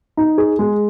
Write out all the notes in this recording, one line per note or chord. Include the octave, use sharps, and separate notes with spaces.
D#4
G#4
G#3